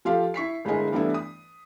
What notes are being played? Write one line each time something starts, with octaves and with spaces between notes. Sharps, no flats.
F3 F4 G4 A4 F5
E4 C#6 B6 C7
G1 G#3 E4 A#4 D#5 G#5
G2 E3 G3 A3 B3 E4
D#6